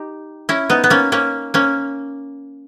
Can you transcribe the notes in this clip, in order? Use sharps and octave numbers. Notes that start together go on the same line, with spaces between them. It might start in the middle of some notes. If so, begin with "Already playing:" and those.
Already playing: D#4 G4
C#4 E4
B3 D#4
B3
A#3 C#4
A#3 C#4
A#3 C#4